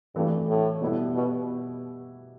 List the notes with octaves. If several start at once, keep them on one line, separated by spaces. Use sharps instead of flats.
G2 E3 A3 D4 F#4
A2
B2 G3 B3 E4
B2